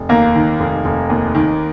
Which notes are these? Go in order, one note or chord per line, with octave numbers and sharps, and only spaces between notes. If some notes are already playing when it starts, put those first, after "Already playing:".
Already playing: F1
D#2 A#3
D#3
F1
F1
D#2
D#3